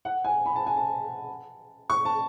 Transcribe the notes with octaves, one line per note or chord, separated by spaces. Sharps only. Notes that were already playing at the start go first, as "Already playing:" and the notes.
F#5
G#5
B5
A5
G#5
A5
C#6
A5